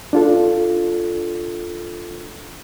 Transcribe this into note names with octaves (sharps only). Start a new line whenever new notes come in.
D4 F4 A4